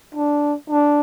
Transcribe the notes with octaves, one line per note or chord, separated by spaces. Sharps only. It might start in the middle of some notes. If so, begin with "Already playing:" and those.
D4
D4